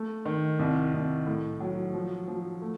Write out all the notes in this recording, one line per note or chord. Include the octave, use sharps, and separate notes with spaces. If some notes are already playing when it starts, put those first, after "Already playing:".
Already playing: A3
D#3
C2
C2
A2
F#3
F3
F3
A3